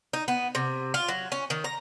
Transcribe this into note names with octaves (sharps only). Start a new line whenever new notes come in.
D#4
B3
C3
F4
F#3
C#4
D#3
A#5